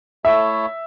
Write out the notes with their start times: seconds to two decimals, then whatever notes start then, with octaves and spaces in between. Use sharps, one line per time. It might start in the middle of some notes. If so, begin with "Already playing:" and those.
0.25 A3 E4 A4 C#5 E5